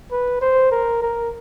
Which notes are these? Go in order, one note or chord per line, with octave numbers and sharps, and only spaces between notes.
B4
C5
A#4
A#4